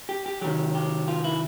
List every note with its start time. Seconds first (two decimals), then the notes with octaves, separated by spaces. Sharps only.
0.09 G4
0.26 G4
0.41 C3 D#3 F#3 G4
0.75 G4
1.08 F4
1.24 E4